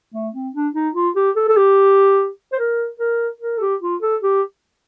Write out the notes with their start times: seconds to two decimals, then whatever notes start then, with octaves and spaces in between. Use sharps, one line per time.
0.14 A3
0.35 C4
0.54 D4
0.75 D#4
0.95 F4
1.16 G4
1.36 A4
1.49 A4
1.57 G4
2.52 C5
2.59 A#4
3.00 A#4
3.41 A#4
3.58 A4
3.61 G4
3.82 F4
4.02 A4
4.23 G4